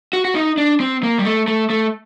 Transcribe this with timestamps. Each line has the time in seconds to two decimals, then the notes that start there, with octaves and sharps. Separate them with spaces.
0.13 F#4
0.25 F#4
0.35 D#4
0.58 D4
0.80 C4
1.03 A#3
1.19 G3
1.25 A3
1.48 A3
1.70 A3